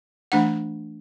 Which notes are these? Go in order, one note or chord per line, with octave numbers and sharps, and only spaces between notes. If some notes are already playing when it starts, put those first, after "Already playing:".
E3 A3 D4 F#5